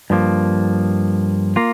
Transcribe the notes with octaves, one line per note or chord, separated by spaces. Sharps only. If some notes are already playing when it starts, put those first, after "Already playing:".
G2 F3 A#3
A#3 F4